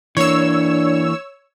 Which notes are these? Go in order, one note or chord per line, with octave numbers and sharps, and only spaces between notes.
E3 A#3 D4 C#5 E6